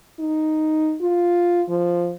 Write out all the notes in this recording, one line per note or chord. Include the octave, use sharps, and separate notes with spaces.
D#4
F4
F3